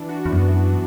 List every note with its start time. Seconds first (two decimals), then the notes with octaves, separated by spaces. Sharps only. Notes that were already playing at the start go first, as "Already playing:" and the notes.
Already playing: E3 D4
0.09 F#4
0.26 E2
0.32 F#2 B3
0.56 E3